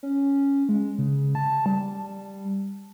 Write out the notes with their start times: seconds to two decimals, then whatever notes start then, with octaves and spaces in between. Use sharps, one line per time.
0.03 C#4
0.69 G#3
0.98 C#3
1.35 A5
1.66 G3